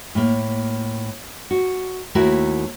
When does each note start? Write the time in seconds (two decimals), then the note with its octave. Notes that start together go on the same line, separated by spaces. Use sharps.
0.15 A2 A#3
1.51 F#4
2.15 D#2 A3 E4 F#4 A#4